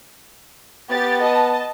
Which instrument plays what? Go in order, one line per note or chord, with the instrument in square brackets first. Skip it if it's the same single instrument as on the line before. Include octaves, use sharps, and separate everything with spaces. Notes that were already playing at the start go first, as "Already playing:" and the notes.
[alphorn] B3 [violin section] G4 A6
[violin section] D#5 A5